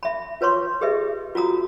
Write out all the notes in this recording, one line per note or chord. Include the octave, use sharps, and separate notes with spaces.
E5 B5
F4 B4 C#5 C6 C#6
G4 G#4 B4 D#5 E5
F4 F#4 A#5 D#6